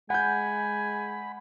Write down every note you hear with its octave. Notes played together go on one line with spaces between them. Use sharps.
G#3 F#5 G#5 B5 G6